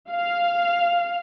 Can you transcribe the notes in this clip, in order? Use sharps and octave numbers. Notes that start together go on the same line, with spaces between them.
F5